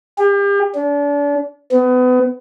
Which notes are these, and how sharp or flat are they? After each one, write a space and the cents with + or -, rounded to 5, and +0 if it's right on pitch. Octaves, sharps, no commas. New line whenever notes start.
G4 +40
D4 -35
B3 +30